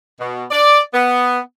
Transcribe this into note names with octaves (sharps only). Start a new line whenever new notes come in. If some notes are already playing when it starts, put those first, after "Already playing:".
B2
D5
B3